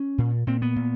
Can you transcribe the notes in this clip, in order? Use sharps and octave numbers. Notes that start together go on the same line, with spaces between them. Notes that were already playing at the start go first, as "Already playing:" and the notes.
Already playing: C#4
A#2
A#2 C4
B3
A#2